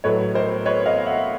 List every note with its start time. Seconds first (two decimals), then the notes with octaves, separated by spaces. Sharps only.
0.04 A2 F#3 A3 B4 C#5
0.35 A#4 C5
0.65 B4 C#5
0.86 D#5 F5
1.06 E5 F#5